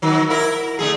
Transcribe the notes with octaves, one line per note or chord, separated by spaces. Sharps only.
D#3 F#3
E4 A#4
D3 A3 G#4